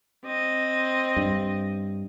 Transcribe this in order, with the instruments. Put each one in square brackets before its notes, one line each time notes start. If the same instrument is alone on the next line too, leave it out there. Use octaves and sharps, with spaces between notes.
[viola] C4 D#5
[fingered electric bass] G2